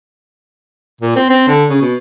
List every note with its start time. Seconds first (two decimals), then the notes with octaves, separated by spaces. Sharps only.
1.01 A#2
1.16 C4
1.29 C4
1.48 D3
1.69 C#3
1.81 B2